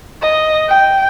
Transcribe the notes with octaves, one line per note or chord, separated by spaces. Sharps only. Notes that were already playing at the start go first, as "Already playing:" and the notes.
D#5
G5